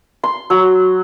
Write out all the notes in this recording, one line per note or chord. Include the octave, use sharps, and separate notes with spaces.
C6
F#3